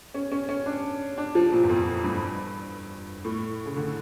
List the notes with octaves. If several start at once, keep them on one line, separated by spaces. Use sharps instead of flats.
C#4
C#4
C#4
D4
D4
F3
A#2
E2
F2
G2
A2
C#3
D3